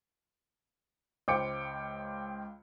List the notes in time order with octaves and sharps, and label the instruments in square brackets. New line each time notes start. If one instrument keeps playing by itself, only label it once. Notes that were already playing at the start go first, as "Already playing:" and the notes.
[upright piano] C#2 C5 F5 G5 D6 C#7